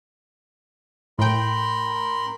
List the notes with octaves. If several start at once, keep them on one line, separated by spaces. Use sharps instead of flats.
A2 A#4 G5 B5 C6